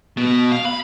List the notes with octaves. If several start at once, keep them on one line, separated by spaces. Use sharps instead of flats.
B2
F5
B5